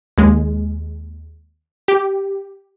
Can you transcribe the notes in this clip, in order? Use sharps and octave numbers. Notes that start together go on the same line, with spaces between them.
D#2 G#3
G4